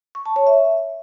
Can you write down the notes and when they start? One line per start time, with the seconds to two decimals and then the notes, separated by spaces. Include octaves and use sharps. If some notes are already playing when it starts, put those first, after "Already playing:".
0.15 C#6
0.26 A5
0.36 C#5
0.47 E5